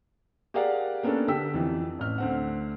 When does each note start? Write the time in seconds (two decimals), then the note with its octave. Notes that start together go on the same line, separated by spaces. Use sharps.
0.54 G4 G#4 A#4 D5 F5 F#5
1.03 A#3 B3 C#4 D4 A4
1.28 D3 G4 G5 E6 B6
1.54 F2 E3
1.99 A1 F6
2.18 D2 C4 F#5